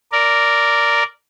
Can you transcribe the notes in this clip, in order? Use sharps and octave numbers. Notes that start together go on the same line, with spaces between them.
A#4 D5